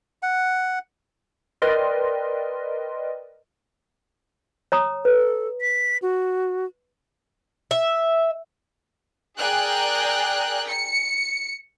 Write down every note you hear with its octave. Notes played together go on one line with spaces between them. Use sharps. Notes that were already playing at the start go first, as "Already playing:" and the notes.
F#5
A#4 B4 D5 D#5 G5 C6
C#5 A#5 D#6
A4 B4
B6
F#4
E5
G#4 A#4 D5 G5 G#5 F#6
C#7